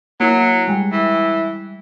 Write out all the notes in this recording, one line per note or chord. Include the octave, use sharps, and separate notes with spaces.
F#3 A#3 E4
G3 G#3
E3